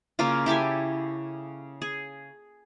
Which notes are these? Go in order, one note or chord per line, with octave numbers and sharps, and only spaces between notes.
C#3 A#3 C#4 F4
E4 G4 A4 G#5
G#4